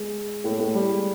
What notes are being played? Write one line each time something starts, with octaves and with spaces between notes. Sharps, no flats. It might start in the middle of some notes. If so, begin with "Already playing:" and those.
Already playing: G#3
A2 A3
A2 A3
G3
G#3